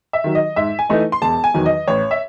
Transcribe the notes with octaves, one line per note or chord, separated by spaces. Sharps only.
E5
D#3 F#3
D#5
G#2 E5
G#5
E3 A3 D#4
C6
E1 A5
G#5
E2 D#3 F#3
D#5
A1 C#5
E5